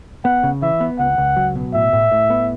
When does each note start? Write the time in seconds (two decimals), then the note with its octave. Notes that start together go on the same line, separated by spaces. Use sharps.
0.24 B3 F#5
0.43 C#3
0.62 E3 E5
0.80 B3
0.99 C#2 F#5
1.18 C#2
1.36 F#3
1.55 B2
1.74 A2 E5
1.93 A2
2.12 A2
2.30 B3